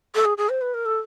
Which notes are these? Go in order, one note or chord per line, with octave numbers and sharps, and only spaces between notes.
A4
G#4
G#4
C5
B4
A#4
A4